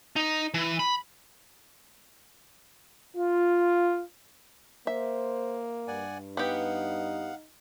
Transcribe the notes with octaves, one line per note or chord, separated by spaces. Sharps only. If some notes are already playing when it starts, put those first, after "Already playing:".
D#4
E3
B5
F4
A#3 C5 E5
G2 D5 F#5 G#5
B3 D#4 G4 F5 F#5